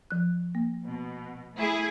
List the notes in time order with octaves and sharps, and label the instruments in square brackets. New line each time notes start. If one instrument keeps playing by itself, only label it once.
[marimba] F3 F#6
A#3
[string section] B2
A3 E4 G#4